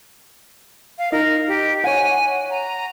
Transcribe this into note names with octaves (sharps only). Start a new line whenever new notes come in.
F5
D#4 A#4
G4
C#5 F#5 G#5
A#5